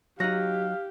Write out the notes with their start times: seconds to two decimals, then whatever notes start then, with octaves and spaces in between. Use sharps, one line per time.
0.20 F#3 D#4 G4 F5 F#6 A#6